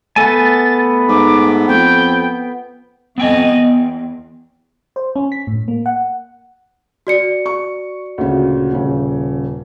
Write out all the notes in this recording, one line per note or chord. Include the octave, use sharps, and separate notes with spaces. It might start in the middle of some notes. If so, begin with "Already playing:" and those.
A3 B3 A4 G#5 A6
G#2 D6
F2 G5
F2 B3 D#5 G5 G#5
E2
C5
C#4
B6
A2
A#3
F#5
F#4 D5 C#7
C#6
D2 A#2 C#3
D#1 C#3